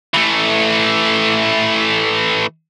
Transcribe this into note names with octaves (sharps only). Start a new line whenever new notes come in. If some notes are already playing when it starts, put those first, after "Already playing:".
E3 A3